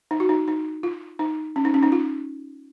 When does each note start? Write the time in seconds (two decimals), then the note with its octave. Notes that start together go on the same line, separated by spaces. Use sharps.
0.11 D#4
0.20 F#4
0.29 D#4
0.48 D#4
0.83 F4
1.19 D#4
1.56 C#4
1.65 D#4
1.74 C#4
1.83 D#4
1.92 F4